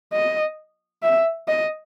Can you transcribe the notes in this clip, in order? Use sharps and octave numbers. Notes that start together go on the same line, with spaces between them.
D#5
E5
D#5